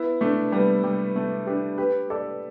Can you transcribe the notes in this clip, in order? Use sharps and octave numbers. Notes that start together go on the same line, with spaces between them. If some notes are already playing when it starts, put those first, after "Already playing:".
Already playing: B3 E4
A3 D4
G3 B3
G3
A3
D4 G4
G4 B4
A4 D5